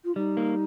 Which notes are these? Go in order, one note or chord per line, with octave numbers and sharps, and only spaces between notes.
F4
G3 D#4
A#3